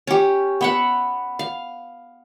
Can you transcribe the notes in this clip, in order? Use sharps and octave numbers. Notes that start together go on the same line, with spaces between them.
C#4 G4
B3 E5 F#5
F5